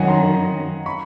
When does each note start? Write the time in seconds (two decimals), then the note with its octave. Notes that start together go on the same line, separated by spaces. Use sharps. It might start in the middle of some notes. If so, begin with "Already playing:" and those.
Already playing: F#2 D#3 F#3 C#5 D#5 F5 F#5 G#5
0.08 A#5 C6
0.86 B5 C#6